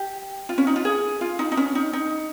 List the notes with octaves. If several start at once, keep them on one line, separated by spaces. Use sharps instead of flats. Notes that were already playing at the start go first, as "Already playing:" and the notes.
Already playing: G4
F4
C#4
D#4
F4
G#4
F4
D#4
D#4
C#4
D#4
D#4